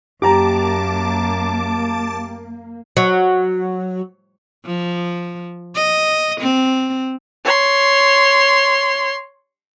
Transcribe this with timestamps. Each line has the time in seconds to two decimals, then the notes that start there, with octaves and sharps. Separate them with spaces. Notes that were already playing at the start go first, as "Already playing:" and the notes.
0.22 F#2 A#3 G4 A5 A#5 D6
2.97 F#3
4.65 F3
5.75 D#5
6.41 C4
7.45 C#5 C6